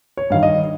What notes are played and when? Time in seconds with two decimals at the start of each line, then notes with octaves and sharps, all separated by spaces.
0.17 C#5
0.30 G2 D#3 F5
0.43 D#5